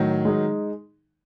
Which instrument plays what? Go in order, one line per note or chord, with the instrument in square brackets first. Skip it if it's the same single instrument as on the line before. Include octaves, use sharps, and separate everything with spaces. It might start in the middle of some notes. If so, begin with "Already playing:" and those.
Already playing: [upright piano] A2 [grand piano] D#3 F#3
[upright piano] G#3 D#4